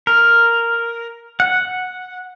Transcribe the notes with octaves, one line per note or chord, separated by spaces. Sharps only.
A#4
F#5